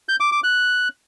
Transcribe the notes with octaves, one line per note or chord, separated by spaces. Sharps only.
G6
D6
D6
F#6